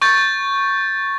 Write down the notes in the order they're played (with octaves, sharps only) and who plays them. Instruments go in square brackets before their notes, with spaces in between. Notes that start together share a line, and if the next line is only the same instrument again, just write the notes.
[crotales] C#6 G6 A6